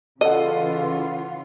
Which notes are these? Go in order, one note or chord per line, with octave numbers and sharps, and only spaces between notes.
C#3 E3 F4 A4 D#5 F#5